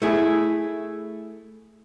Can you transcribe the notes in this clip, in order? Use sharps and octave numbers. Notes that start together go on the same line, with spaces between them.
A3 E4 G#4